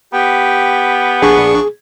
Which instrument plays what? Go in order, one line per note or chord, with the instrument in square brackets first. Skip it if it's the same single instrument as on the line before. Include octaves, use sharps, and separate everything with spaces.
[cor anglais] B3 [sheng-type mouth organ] G4 G5
[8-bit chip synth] A#1 D4 C#6 [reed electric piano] G#4